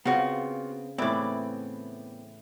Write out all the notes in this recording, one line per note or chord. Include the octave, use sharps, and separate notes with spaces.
C#3 B3 C4 F4 F#4
A2 E3 B3 C4 E4 D5 D6